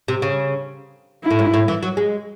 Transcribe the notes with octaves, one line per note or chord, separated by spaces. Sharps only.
C3
C#3
E4
A2
G#2
A2
E3
F#3
G#3